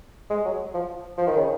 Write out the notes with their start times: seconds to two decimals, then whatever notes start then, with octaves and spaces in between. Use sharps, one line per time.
0.30 G#3
0.45 F#3
0.74 F3
1.18 F3
1.27 D#3
1.37 C#3